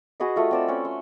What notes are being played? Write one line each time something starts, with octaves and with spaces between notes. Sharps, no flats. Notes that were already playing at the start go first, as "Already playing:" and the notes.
F#4 G#4 B4 D#5
A3 F4
C4 D5 E6
C#4 B4 F#5
C6